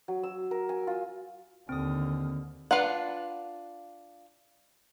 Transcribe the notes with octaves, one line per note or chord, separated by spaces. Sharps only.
F#3
E6
A#4
G#5
F4
D#2 D3 C4 D#6
D4 F4 B4 F#5